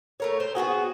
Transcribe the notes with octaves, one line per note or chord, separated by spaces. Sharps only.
A3 A#4 C#5
C5
B3 C4 F#4 G#4